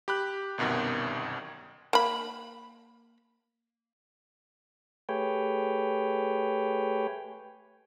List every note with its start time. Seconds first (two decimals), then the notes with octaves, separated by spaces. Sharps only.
0.08 G4 B5 F#6
0.58 G1 C2 F#2 B2 D#3
1.93 A#3 B5
5.09 A3 G4 G#4 B4 C#5 G5